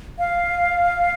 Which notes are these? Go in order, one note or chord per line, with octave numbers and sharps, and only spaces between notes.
F5